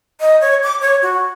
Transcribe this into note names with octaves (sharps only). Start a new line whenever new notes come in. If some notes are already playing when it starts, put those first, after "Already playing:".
D#5
C#5
D6
C#5
F#4